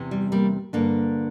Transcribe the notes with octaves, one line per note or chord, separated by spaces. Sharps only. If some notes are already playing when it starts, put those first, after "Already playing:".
Already playing: E2 C3 E3
G3
G3 A#3
G2 D3 A#3 D4